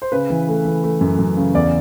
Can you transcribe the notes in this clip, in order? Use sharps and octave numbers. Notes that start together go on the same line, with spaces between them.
C5
C#3 B4
E3
A3
E3
A3
F#2
F#2
C#3
E2 D5